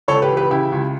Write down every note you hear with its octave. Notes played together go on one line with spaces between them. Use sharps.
C#2 A4 C#5
G4 B4
E3
G4 B4
C#3 E4 G4
C#2